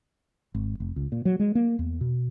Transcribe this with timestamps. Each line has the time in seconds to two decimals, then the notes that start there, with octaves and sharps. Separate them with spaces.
0.54 G#1
0.80 F1
0.96 C#2
1.12 A#2
1.25 F#3
1.39 G#3
1.55 A#3
1.79 E2
2.01 B2